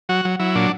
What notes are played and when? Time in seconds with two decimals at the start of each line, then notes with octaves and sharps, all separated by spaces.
0.09 F#3 F#4
0.25 F#3
0.39 F#3 E4
0.55 A#2 D4